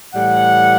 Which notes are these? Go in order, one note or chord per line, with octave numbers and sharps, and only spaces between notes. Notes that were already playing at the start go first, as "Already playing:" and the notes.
A2 E3 G3 F#5